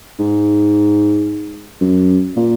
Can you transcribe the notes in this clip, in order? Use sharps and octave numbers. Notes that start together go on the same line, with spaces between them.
G#2
F#2
A#2